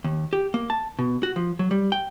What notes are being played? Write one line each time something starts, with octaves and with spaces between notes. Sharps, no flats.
D#2
G4
A#3
A5
B2
F#4
F3
F#3
G3
G5